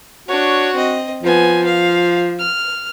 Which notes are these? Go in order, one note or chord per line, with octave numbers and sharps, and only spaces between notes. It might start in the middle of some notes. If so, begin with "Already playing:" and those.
D4 F#4 C#5
C4 D#5
F3 B3 G#5
F5
F6